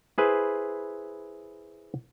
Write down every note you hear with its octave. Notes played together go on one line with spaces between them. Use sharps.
E4 G#4 B4 C5